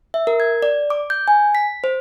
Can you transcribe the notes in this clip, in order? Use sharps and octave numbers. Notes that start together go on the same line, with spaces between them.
E5
A#4
G#6
D5
D6
G6
G#5
B6
C5